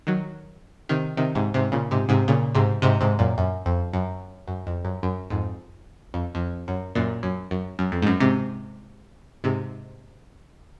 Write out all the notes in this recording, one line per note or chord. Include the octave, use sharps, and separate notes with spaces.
D#3 F#3
C3 D#3
C3 D#3
G#2 C3
G#2 C3
A#2 C#3
G#2 C3
G#2 C3
A#2 C#3
G#2 C3
G#2 C3
G#2 C3
F#2 A#2
F#2
F2
F#2
F#2
F2
F#2
F#2
F2 G#2
F2
F2
F#2
F#2 A#2
F#2
F#2
F#2
F2
G#2
F#2
G#2 C3
G#2 C3